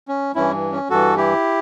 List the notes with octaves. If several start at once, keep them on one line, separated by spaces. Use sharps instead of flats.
C#4
G2 E3 C#4 E4
C#4
G2 E3 F#4 A4
E4 G4